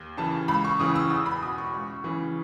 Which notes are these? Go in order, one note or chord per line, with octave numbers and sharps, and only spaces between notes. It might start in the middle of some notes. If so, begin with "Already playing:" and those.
Already playing: D#2
C#3 E3 A5
C#2 B5
C#6
C#3 E3 D#6
E6
E2 D#6
B5
B2 D#6
C#6
C#2
C#3 E3